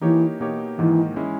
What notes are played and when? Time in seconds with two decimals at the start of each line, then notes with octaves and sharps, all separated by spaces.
0.01 E3 A#3 D#4 G4 C#5
0.40 B2 A#3 D#4 G4 C#5
0.78 G#2 D#3 E3 A#3 D#4
1.16 G#3 C#4 E4